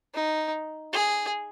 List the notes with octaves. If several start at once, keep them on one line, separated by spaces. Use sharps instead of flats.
D#4
G#4